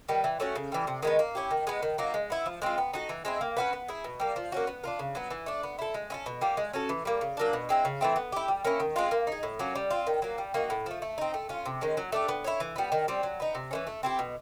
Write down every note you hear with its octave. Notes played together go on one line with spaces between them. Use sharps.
D#3 G3 B3
E3
A3 C#4 F#4
C#3
E3 G3
C3
D#3 G#3 B3
A#3
C#4 E4 G4
D#3
G#3 B3
D#3
F#3 A#3 D#4
G#3
B3 E4
F3
G#3 C4 F4
B3
D#4 F#4 A4
E3
G#3 C4 E4
A#3
C#4 F#4 B4
B3
E4 G#4
B2
G3 A#3
F3
A#3 C#4 F#4
B3
D4 F4 A#4
C#3
F#3 B3
E3
A3 D4
B3
E4 A4
G#3
C#4 E4 A4
B2
G3 A#3
G#3
C#4 F#4 A4
E3
G3 A#3
C#3
F#3 A#3 D4
B2
G#3 C4 E4
C#3
E3 A3 C4
B3
E4 G4
G3
A#3 C#4 E4
D#3
G#3 C4 F4
A#3
D#4 G#4
A2
F#3 A#3 C#4
G3
C4 F4
D#3
F#3 A#3
G3
A#3 D#4 F#4
A2
F3 A3
A3
C4 D#4
A3
C#4 F4
C3
D#3 G#3 C#4
F#3
A3 D4 G4
B3
E4 G#4 C#5
E3
G3 B3
D#3
G3 C4
F#3
B3 D#4
C3
E3 A3 C#4
A3
C4 E4 G4
B2